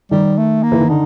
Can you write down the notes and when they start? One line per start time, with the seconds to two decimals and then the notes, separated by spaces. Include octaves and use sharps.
0.11 D#3 G3
0.38 A3
0.63 A#3
0.72 E3
0.81 D#3
0.89 D3 D#4